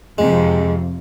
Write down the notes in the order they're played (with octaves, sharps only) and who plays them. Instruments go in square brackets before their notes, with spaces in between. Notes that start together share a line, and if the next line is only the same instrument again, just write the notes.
[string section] F2 C3 [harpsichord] G#3